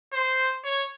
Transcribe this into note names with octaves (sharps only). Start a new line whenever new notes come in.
C5
C#5